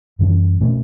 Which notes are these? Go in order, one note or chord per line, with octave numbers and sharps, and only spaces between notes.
F#2 E3 G3 C#4
B2 A3 C#4